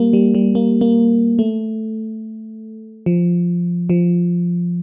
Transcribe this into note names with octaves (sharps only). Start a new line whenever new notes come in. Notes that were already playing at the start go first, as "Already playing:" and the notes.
Already playing: G3 A#3
G3
G3
A#3
A#3
A3
F3
F3